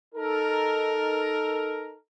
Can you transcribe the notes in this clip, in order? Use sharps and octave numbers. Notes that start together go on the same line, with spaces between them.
D#4 A4 A#4